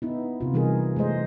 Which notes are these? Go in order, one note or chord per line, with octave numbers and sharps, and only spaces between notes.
B3 D#4 E4
C3 F4
E3 G3 D#4 G#4 A#4
G#3 A3 C5 D#5